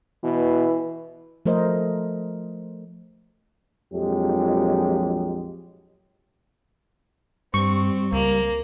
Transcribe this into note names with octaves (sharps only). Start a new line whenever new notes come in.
B2 E3
F3 A3 A#4 C5 D#5
A#1 F2 F#3 G#3 G4
G2 G3 C4 C#6
C#2 A#3